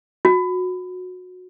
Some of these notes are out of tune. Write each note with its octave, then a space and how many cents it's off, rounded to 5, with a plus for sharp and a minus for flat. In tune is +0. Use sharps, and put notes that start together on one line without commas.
F#4 -20